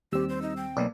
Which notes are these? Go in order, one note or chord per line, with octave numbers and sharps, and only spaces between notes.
D#2 G3 C4 G4 E6
C5
D#4
G5
B1 A#3 D5